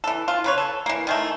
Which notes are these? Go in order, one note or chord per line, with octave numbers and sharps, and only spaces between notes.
E3 A4
F4
C#3 B4 C#5
A4
E3 A#3
D#3 G#3 A3